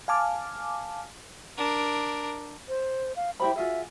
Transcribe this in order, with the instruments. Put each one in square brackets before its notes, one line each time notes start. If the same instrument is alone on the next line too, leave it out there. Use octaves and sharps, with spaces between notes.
[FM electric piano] F5 G#5 A5 D6 F6
[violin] D4 A#4
[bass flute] C5
F5
[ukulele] E4 G4 B5 [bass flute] C5
[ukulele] F4 F#4 G#4 [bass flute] E5